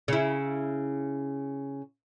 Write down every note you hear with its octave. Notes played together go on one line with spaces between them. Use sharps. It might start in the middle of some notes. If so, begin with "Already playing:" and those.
C#3 E4